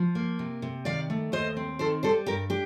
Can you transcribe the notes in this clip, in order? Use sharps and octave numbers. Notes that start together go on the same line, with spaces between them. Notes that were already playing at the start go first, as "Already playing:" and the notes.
Already playing: F3
A#3
C3
C3
D#3 D5 F5
A3
D#2 C5 D#5
C4
D#3 A4 C5
G3 A4 C5
G2 G4 A#4
D4 G4